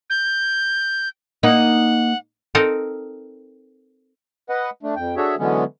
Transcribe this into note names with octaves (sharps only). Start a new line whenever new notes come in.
G6
A#3 D#4 F#5
C4 D#4 A4 A#4
B4 D#5 F#5
A3 D4
F2 G5
D4 F#4 G#4 A4 C#5 E5
D3 E3 F#3 G#3 B3 C#4